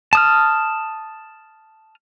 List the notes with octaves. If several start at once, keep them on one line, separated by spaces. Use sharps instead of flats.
A5 D#6 F6